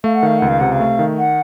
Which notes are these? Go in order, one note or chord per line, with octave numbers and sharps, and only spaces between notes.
A3 F5
F#5
D#3 F5
C#2 F#5
F5
C3 F#5
F5
A3
D#3
F#5